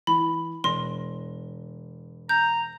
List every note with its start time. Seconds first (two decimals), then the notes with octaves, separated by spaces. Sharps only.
0.07 E3 B5
0.64 E1 C6 A#6
2.29 A#5 G6